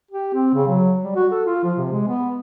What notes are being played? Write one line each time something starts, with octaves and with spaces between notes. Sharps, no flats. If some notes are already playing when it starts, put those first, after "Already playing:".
G4
C4
C#3
F#3
G3
F#4
A4
F4
F3
C3
G#3
B3